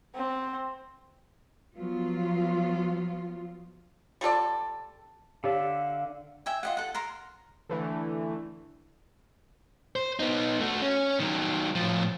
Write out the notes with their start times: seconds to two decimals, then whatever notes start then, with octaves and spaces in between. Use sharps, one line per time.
0.15 C4
1.76 F3 F#3 B3 F4
4.21 G3 F4 A4 D5
5.44 D3 G4 C#5 E5 F5
6.46 E5 G5 G#5
6.63 F4 D#5 F#5
6.77 A4 F#5
6.95 A#4 A#5 C6
7.69 D3 E3 A3
9.96 C5
10.20 B3 D#4
10.61 A3 F#4
10.82 C#4
11.20 D#3 F#3
11.75 A2 F3